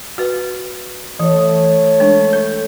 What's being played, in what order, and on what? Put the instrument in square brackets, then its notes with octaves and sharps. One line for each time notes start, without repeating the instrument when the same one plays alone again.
[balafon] F#4 B4
[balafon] E3 [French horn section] A3 C#5
[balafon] G#3 D4
A4